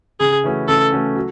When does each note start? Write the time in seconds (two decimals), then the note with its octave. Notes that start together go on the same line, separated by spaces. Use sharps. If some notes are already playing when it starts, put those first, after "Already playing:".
0.20 C#3 G#4
0.44 E3 A3 C#4 F#4
0.68 C#3 A4
0.92 E3 A3 C#4 F#4
1.15 F#3